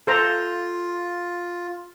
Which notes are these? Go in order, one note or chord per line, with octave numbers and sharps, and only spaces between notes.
F4 A4 C5 A#5